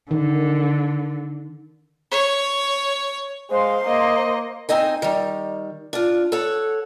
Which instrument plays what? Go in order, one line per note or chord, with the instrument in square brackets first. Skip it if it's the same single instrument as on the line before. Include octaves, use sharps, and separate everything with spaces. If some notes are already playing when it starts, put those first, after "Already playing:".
[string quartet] D3 [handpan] D#3
[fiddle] C#5
[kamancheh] G#3 F5 [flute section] C5 C6
[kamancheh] A#3 D#5
[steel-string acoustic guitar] C4 D#4 D#5 G#5
D#3 G3
D4 F4
A4 C#5 F#5